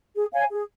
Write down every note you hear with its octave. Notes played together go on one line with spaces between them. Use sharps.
G#4
C#5 F5 G#5
G#4